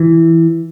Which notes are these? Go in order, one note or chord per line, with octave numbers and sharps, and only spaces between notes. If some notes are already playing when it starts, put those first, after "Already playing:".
Already playing: E3